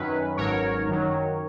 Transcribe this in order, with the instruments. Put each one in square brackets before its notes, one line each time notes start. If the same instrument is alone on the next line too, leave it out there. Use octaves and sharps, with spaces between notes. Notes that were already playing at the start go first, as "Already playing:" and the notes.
Already playing: [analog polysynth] F#2 D#3 F#3 C#4 B4
G#1 G#2 F#3 C#4 A#4 C#5
F#2 D#3 F#3